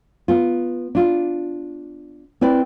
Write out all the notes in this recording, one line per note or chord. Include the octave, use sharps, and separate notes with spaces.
B3 F4
D4 F4
C4 E4 B4 D5